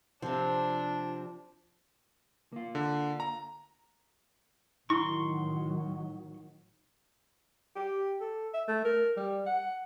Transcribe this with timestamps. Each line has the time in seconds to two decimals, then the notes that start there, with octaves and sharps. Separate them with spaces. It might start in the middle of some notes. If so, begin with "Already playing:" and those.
0.22 C3 F3 C4 D4
2.53 A#3 F4
2.75 D3
3.20 A#5
4.90 A1 D#3 F#3 E4 C6 C#6
7.76 G4
8.21 A4
8.54 E5
8.68 A3
8.85 A#4
9.17 G3
9.46 F#5